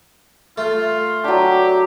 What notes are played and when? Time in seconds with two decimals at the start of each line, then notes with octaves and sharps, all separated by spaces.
0.58 A3 F4
1.24 F#3 D4 G4